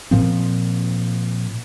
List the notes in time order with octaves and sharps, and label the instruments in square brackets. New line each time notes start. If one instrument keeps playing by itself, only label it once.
[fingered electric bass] A#2 F3 C4